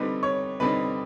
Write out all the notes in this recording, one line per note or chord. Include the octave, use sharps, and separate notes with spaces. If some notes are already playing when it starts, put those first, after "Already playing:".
Already playing: D3 G3 C4 D#4 B4 B5
C#5 C#6
D3 G3 C4 D#4 B4 B5